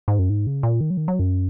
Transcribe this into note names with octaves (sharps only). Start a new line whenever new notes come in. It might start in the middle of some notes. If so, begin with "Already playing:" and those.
G#2
F#2
G#2
C#3
A#2
D#3
F#3
D#3
F#3
F#2